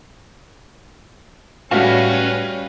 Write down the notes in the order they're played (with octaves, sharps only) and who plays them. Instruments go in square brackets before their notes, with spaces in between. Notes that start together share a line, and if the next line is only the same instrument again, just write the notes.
[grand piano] G3 A3 F5 [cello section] C#4 [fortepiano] F#4 [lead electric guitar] B4 A5